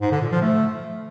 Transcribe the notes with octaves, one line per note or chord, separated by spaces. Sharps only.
G#2
D3
A#2
F3
A3